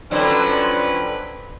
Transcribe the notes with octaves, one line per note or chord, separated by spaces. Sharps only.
D3 F3 F#3 C4 C#4 B4